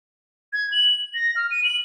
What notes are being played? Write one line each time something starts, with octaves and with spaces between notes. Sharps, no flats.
G#6
F#7
A#6
F6
D#7
F#7